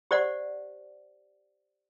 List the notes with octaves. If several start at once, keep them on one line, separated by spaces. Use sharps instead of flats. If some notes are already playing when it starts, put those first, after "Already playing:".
G4 C5 D5 F#5